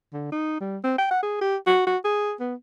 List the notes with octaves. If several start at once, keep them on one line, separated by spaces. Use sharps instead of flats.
D3
D#4
G3
C4
G5
F#5
G#4
G4
F#4
F#4
G#4
B3